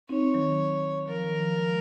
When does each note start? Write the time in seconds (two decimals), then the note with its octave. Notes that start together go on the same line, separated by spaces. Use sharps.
0.09 C4 D#4 C#5
0.34 D#3 F#3
1.08 F3 A#4
1.24 D#3
1.40 F3
1.56 F3 G#3